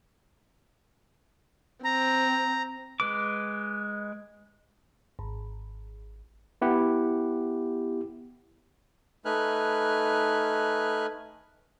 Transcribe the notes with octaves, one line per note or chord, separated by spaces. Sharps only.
C4 A#5
G#3 B4 D6
G#1
B3 E4 G4 F#5
A3 D#4 B4 G#5 F6 F#6